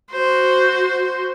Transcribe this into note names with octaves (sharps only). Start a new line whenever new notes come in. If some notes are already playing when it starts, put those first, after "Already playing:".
F#4 C5